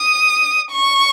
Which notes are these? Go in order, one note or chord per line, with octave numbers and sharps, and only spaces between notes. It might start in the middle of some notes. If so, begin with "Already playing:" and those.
Already playing: D#6
C#6